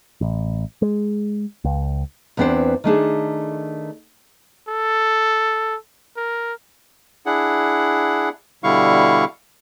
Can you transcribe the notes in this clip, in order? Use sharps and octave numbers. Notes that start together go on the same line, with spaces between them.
A1
G#3
C#2
E2 E3 B3 C4 D4 C5
D#3 A3 D4 G#4
A4
A#4
D4 E4 G#4 F#5
B2 D3 G3 E4 F5 C#6